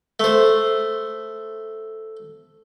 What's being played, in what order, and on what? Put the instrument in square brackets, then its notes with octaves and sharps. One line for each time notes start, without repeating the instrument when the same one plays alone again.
[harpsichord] A3 C5